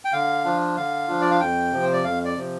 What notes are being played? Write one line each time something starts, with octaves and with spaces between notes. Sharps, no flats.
G5
D3 F5
F3 D4 F4
D3 F5
F3 D4 F4
D5
F5
F2 G5
C3 F3
C5
D5
F2 F5
D5
C3 F3